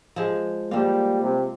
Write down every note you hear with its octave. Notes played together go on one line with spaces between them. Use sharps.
F3 G#3
F3 G3 A#3 F4
C3